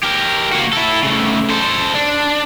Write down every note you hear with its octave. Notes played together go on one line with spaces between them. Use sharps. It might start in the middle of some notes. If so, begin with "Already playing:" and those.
G4 A#4
A#3 F#4
E4 A4
C#3 A3
A4 C5
D4